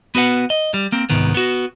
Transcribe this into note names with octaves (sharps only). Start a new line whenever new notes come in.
B3 F#4 B4 F#5
D#5
G3
A#3 C4
C2 G#2 D#3 B3
B3 F#4